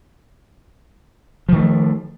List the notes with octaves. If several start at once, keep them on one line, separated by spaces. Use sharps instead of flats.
D#3 F3 A3